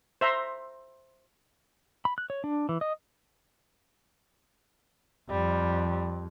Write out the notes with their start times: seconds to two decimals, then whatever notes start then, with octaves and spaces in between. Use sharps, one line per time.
0.21 C5 E5 A#5 C6
2.05 B5
2.18 F#6
2.30 C#5
2.44 D4
2.69 E3
2.81 D#5
5.31 F2 G3